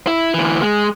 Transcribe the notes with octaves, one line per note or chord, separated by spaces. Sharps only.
E4
D2 E3
G#3